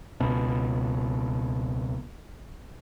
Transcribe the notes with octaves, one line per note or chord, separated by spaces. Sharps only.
C#2 B2